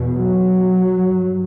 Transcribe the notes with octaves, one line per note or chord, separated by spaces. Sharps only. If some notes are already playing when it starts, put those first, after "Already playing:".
Already playing: E2 B2
F#3
G2